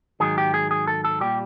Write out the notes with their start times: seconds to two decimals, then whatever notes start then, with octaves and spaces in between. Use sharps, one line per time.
0.20 G#2 D#3 F#3 G#4
0.38 G4
0.54 G#4
0.71 G#4
0.87 A4
1.04 A4
1.21 A#2 G3 G4